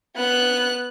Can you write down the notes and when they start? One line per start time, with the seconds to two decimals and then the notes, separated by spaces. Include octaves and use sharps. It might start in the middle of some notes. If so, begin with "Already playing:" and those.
0.16 B3 F#6